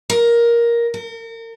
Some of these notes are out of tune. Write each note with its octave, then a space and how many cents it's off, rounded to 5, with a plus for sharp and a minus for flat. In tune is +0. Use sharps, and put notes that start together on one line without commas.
A#4 +10
A#4 -35